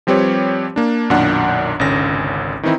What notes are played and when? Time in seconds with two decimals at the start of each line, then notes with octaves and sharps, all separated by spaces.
0.07 F3 G3 C4 G4 B4 C#5
0.76 A#3 D4
1.10 B1 F#2 A#2 D#3 D4 F#5
1.80 G#1 C#2 D3 C#4 A#6
2.63 D#3 E3 C4 D#4 E4